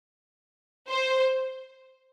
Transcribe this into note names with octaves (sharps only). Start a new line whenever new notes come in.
C5